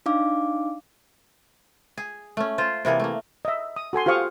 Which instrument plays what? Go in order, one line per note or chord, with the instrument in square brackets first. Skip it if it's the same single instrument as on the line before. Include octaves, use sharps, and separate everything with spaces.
[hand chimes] D4 D#4 F5 D6
[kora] G#4
A3 C#4
F4 C5
C3 E3 A#3 G#4
A3 A#3
[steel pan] D#5 E5
D#6
F#4 A4 G#5 C6
F4 G4 C5 F5 C#6 D#6